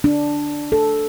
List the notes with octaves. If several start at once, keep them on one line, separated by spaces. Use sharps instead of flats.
D4
A4